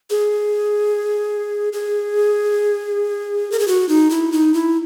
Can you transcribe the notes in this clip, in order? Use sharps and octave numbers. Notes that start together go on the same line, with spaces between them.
G#4
G#4
A#4
G#4
F#4
D#4
E4
D#4
E4